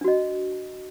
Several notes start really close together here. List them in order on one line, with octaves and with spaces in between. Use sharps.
D4 F#4 D#5